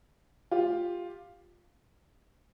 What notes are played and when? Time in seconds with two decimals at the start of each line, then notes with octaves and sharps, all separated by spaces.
0.51 F4 G4